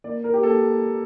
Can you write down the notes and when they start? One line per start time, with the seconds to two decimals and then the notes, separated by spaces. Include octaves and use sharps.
0.04 A#3 D5
0.24 A#4
0.34 G4
0.43 A#3 A4